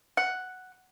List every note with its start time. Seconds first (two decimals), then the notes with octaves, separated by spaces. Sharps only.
0.17 F#5